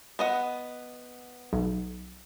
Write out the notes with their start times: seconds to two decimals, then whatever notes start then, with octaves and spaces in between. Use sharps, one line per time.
0.19 B3 D#5 F#5
1.53 B1